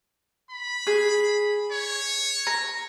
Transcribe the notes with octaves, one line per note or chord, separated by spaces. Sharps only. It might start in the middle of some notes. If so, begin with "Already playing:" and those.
B5
G#4
C#5
A#5